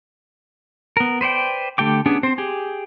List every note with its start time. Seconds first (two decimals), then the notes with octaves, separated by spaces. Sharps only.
0.97 B3 A#4
1.21 B4 C5 D5 G5
1.78 D3 A3 G4 G5 D6
2.06 B3 C#4 D4 G4 G#4
2.23 C4 C5
2.38 G4 G#4